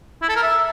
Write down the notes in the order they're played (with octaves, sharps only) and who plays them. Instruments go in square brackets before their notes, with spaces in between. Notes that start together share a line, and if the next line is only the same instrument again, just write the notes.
[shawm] E4
A4
A#4
E5